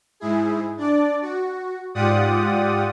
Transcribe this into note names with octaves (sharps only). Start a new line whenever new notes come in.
G#2 E4 G#4
D4 D5
F#4
G#2 F4 G4 D5 F#5 D#6